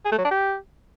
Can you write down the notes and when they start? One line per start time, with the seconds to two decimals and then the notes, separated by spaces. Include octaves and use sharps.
0.05 G#4
0.12 A3
0.18 F#3
0.24 D4
0.31 G4